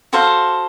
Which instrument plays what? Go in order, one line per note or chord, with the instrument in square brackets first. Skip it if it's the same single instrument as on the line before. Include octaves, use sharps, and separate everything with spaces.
[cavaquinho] F#4 A4 C5 F5